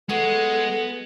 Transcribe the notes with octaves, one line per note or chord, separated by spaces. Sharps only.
G#3 B3 F#4 G#4 A4